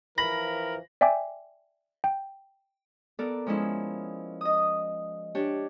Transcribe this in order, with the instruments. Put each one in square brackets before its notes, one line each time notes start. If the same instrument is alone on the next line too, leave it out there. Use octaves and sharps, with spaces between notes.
[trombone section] E3 F3 [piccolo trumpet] A#4 [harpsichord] B5 [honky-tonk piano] A#6
[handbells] D5 E5 G5 G#5 D6
G5
[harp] B3 A4 A#4 D5
F3 G#3 C#4 E4
D#5 D#6
D4 G4 C#5